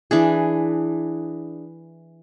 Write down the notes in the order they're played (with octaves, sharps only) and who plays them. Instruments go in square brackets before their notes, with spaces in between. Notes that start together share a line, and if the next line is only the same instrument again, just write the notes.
[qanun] E3 D4 G#4